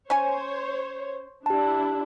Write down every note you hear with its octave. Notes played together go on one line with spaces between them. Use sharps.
C#4 C5 C#5 G#5
D4 E4 G4 A5